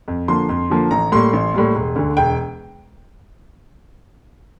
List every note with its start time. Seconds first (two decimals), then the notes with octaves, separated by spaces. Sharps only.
0.08 F2
0.28 D3 F3 A#3 C6
0.49 F2
0.70 D3 F3 A#3
0.91 A1 A#5
1.12 A2 G3 A#3 C6
1.33 A1
1.54 A2 G3 A#3
1.75 E1
1.96 D2 D3
2.17 E1 G5